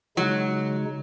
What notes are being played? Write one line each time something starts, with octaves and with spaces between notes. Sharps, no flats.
C#3 F#3 G#3 D#4